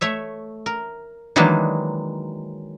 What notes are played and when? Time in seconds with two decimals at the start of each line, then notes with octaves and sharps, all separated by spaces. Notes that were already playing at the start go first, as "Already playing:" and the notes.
0.01 A3 C#5 E5
0.66 A#4
1.36 D#3 E3 F#3 G#3 A#3 D4